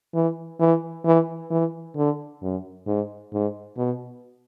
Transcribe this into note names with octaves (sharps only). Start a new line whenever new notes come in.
E3
E3
E3
E3
D3
F#2
G#2
G#2
B2